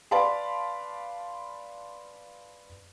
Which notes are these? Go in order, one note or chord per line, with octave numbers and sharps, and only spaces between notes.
B4 D5 F5 A5 B5 C6